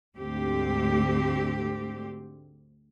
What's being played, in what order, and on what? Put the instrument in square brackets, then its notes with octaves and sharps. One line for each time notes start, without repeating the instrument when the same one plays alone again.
[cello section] D2 G#2 C4 G4